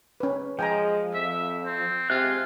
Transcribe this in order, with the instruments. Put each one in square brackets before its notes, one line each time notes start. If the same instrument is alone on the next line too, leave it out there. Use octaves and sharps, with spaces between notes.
[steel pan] C#4 B4
[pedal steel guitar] F3 [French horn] G#3 [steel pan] G5 G#5 A#5
[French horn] F2 [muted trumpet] E5
[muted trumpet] C4
[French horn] C3 [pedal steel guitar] G#3 E5 F#6 [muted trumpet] F4